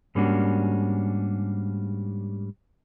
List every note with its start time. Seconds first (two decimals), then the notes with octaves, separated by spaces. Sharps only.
0.15 G#2 G3 A#3 C#4 D4 F#4